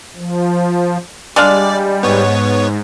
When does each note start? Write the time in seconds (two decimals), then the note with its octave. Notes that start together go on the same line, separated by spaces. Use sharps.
0.16 F3
1.36 G3 G#3 D4 D5 F5
2.03 G#2 B3 C#5